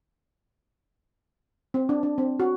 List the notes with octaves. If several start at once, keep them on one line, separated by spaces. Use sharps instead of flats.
C4
D4
D4
C4
F#4